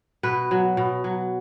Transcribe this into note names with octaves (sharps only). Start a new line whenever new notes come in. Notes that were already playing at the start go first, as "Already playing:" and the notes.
B2 B4
F#3
B2
F#3